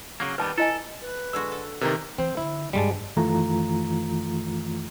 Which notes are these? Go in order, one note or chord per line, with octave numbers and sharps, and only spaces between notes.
C#3 F#3 A#3
D#3 G3 B3 B4 A5
E4 A4 D#5 G#5
B4
D3 G#3 F#4 E6
A4
A2 C3 D#3 E3 A#3 A#4
E3 C4 C5
D3 E4
G2 G3 G#3 A#3 A5
F#2 D#3 E3 A3 F4 A#5